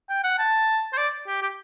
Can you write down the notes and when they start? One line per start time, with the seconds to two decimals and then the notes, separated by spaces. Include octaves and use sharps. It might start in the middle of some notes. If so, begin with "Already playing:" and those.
0.09 G5
0.24 F#5
0.39 A5
0.93 C5
0.97 D5
1.27 G4
1.42 G4